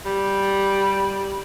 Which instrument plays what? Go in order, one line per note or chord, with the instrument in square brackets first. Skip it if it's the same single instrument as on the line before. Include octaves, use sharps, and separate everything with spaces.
[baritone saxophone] G3